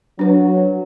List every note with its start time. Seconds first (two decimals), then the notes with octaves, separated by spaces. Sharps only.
0.19 F#3 D4 B4